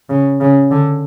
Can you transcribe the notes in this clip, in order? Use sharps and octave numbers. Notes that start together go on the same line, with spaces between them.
C#3
C#3
D3